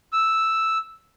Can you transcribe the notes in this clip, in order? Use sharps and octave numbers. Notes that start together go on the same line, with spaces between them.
E6